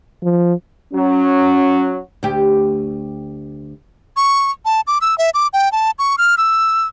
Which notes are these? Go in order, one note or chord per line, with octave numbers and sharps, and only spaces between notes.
F3
F#3 C#4
D2 G4
C#6
A5
D6
E6
E5
D6
G5
A5
C#6
F6
E6